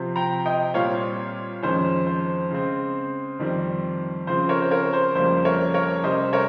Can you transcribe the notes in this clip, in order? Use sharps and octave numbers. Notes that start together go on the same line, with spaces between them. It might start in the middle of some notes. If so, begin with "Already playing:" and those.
Already playing: C3 F3 C4
G5 A#5
D#5 G5
A#2 G3 C4 C#5 F5
F2 D#3 G#3 C#4 C5
C5
C#3 G#3 C4
F2 D#3 G3 C4
C#3 F3 C4 C5
A#4 C#5
C5
A#4 C#5
C5
F2 C#3 G3 A#3 C5
A#4 C#5
A#4 C#5
C3 G3 C#4 C5 D#5
A#4 C#5